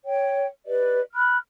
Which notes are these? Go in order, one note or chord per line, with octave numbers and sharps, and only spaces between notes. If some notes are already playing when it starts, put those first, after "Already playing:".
C#5 G5
G4 B4 D5 D#5
B5 F6 F#6